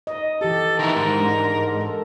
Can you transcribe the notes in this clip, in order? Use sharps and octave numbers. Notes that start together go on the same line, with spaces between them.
D#5
E3 G4 A4
D#3 E4 A#4
G#2
G#3 D4
A4 A#4